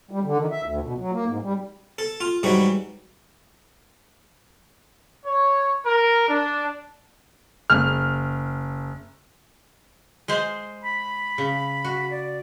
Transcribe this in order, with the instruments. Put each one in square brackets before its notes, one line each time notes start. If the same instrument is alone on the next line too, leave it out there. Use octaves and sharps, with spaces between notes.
[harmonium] G3
D3
D#3
E5
D2
B2
F#3
A#3
G#2
G3
[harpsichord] A4
F4
G#2 E3 F#3 G3 F#4
[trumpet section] C#5
A#4
D4
[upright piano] F#1 F6
[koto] G#3 G#4 C5
[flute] B5
[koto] C#3
F#4
[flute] D5